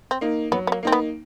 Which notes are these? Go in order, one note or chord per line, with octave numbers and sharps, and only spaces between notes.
C4
A#3 D#4
F#3 B3
B3
A#3
A#3 C4 D#4
B3